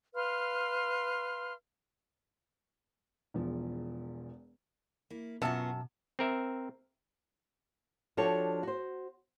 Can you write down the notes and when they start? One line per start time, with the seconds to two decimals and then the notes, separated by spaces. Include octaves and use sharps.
0.15 B4 F5 C6 F6
3.34 E1 E2 F3
5.10 A#3 E4
5.42 F#2 B2 B3 F4 F#4 A5
6.19 C4 A#4 E5
8.17 F3 D4 F#4 G4 A4 C#5
8.63 F#4 C5